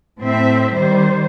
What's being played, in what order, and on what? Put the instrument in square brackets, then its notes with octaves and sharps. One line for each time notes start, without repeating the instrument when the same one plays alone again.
[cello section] A2 C4 E5
D#3 G3 C5